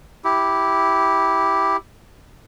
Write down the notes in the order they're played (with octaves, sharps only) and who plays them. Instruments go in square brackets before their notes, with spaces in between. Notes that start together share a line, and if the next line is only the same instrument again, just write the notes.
[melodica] E4 G4